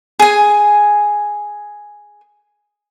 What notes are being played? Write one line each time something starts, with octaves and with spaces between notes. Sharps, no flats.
G#4 G#5